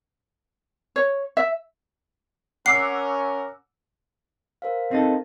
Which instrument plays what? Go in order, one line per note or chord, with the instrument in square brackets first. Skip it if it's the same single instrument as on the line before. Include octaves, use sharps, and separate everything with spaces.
[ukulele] C#5
E5
[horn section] C#4 A#4 [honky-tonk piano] F#5 D6 E6 [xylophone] C7
[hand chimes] A#4 C5 F5
[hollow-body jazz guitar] C4 D#4 A4